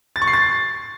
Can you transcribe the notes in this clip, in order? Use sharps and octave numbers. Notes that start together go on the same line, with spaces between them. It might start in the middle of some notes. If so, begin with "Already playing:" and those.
A6
C#6
C7
A6